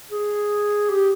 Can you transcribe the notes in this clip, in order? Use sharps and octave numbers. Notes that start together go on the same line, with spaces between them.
G#4
G4